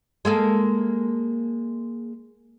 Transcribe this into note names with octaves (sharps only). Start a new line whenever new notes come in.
G#3 A#3 A4